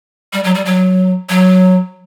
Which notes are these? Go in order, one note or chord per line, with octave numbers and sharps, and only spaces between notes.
G3
F#3
G3
F#3
F#3